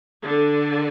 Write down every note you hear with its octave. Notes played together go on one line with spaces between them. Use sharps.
D3